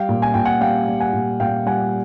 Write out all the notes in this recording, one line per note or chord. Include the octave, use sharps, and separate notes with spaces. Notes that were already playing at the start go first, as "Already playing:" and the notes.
Already playing: G3 F5 G5
A#2
G#5
A#2 G5
F#5 G#5
G3 F5 G5
G3
F#5 G#5
A#2
A#2 F5 G5
G3 F#5 G#5